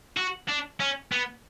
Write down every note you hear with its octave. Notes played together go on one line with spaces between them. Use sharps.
F#4
D4
C#4
B3